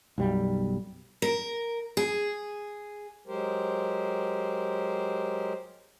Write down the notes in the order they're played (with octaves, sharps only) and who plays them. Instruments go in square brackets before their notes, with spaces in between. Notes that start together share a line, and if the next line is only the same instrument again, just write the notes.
[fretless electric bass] B1 F#2 G3
[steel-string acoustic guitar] A#4
G#4
[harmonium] F#3 G#3 G4 A#4 C5